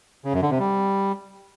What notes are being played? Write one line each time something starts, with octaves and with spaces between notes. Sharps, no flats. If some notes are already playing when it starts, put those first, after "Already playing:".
C#3
F#2
D3
C3
G3